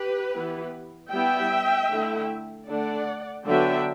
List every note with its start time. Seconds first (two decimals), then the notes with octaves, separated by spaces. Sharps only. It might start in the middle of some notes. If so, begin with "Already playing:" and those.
Already playing: G4 B4
0.33 E3 B3 E4
1.11 G3 B3 E4 E5 G5
1.90 D3 A3 E4
2.69 D3 A3 D4 D5 F#5
3.47 D3 F#3 B3 D4 E5 G5